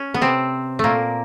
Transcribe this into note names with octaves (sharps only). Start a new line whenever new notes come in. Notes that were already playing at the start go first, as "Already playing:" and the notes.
Already playing: C#4
B3
C3 C4
A#2 A3 A#3